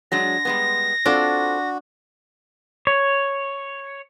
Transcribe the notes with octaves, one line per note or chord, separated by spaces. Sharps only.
F#3 G#3 D4 A#6
G3 G#3 B3
C4 D4 F4 F#4 A4
C#5